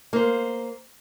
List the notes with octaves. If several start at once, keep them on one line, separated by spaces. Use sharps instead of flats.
A#3 C5